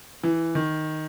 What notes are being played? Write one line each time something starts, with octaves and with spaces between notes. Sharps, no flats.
E3
D#3